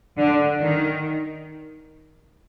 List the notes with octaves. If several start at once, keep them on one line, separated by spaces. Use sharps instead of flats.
D3
D#3